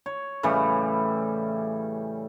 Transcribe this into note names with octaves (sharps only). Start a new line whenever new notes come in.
C#5
A2 C#3 E3 G3